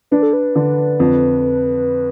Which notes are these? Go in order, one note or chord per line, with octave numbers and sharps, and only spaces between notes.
D4 B4
A4
B4
D3
F2